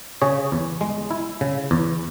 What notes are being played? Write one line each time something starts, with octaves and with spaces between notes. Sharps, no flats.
C#3 G#4 C#5
E2
G#3
E4
C#3
E2